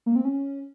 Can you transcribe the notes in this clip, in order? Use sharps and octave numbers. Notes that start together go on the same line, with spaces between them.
A#3
C4
C#4